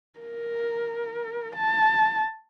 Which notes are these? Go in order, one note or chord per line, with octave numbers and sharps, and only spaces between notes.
A#4
A5